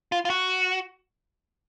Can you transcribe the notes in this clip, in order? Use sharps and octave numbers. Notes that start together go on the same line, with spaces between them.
F4
F4
F#4